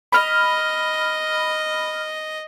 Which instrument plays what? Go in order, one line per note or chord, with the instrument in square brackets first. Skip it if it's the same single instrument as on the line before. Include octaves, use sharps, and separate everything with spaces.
[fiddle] D#5 [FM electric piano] B5 F6